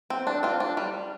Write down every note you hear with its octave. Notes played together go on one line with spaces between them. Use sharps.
C4
D4
C4 F4
D4
G3